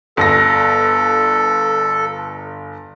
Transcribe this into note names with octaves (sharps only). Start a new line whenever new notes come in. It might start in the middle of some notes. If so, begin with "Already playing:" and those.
G1 A4 A#6